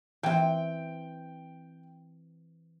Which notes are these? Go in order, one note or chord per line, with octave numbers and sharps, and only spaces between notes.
E3 C4 G5